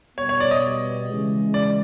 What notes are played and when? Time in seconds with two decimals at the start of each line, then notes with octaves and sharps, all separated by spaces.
0.17 B2 G3 B3 C#5
0.29 C#5
0.40 D5
0.51 D#5
1.09 C#3 E3 G#3
1.54 D5